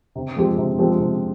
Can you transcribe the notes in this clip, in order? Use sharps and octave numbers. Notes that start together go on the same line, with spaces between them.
C3
F3 G#3 C4 G4
C3
F3 G#3 C4 G4
C3